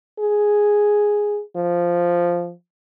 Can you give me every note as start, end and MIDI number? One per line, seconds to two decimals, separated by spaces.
0.19 1.40 68
1.56 2.51 53